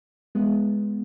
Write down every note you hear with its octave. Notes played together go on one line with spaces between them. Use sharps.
G#3 B3